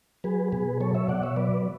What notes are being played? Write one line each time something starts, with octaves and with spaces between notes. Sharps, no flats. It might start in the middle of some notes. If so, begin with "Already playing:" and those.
F#3 G#4 B4
B2 G#4 B4
F#3 A4 C#5
C#5 E5
B2 D5 F#5
C#5 E5
F#3 B4 D5